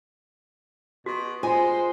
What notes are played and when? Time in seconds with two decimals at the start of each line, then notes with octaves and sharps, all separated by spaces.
1.06 B2 F#4
1.43 G#3 F4 C5 G#5